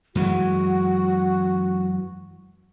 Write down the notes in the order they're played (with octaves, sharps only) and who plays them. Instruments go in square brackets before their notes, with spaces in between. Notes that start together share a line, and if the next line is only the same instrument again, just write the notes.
[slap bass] F#2 E3 G#3 [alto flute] F#4